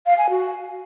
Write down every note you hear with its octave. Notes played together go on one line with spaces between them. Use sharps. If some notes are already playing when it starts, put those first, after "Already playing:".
F5
G#5
F#4